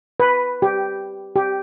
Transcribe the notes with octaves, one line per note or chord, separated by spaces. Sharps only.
B4
G4
G4